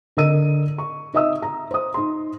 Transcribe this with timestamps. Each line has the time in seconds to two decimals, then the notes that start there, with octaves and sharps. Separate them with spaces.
0.17 D3 A#4 D#5 E6 D#7
0.78 C#6
1.14 D#4 D#5 E5 D#6 E6
1.42 A#5
1.71 C5 D#6
1.94 D#4 C6